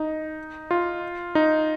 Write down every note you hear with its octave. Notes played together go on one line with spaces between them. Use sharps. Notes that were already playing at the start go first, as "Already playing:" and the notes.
Already playing: D#4
F4
D#4